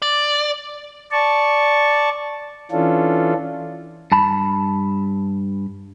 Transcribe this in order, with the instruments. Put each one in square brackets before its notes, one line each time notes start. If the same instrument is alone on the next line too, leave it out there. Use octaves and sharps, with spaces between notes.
[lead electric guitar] D5
[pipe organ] D5 A5 C#6
E3 C#4 D4 F4 A4
[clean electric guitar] G2 A5 B5